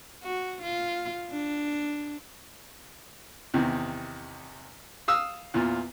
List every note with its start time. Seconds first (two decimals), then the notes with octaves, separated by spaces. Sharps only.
0.23 F#4
0.62 F4
1.31 D4
3.54 E2 C3 D#3
5.08 F5 D#6 E6
5.54 E2 A#2 F4